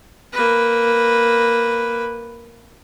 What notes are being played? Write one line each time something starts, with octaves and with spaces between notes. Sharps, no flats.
A#3 B4